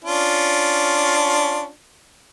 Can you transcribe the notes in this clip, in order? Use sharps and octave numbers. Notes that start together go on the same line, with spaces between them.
C#4 D4 F4